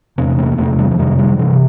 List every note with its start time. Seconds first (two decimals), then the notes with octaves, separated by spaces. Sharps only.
0.18 E2 C3 C4
0.39 A#3
0.58 E2 C3 A3
0.79 G3
0.91 F3
0.99 F2 C3 G3
1.19 G3
1.39 C3 E3